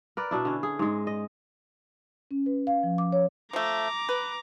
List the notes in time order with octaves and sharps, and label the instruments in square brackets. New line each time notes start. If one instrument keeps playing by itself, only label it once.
[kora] A#4 B4 D5
B2 D4 E4
D3 C#4
G#4
G#2 G#3
D#5
[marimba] C#4
B4
F5
F3
D6
C#5
[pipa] F3 A3 [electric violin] A#5 D6
[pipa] B4